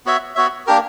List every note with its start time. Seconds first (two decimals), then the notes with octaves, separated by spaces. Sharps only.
0.06 B3 F#4 C#5 E5
0.35 B3 F#4 C#5 E5
0.67 A#3 D4 G4 A#4